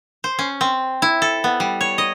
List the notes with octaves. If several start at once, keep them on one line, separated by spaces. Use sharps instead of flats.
C5
C#4
C4
E4
A4
B3
G3
C#5
D#5